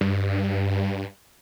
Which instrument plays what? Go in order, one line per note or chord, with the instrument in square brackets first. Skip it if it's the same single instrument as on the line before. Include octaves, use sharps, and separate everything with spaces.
[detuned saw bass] G2